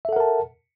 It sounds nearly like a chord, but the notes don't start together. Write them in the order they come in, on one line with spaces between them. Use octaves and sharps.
E5 A4 F#5 A#4 A5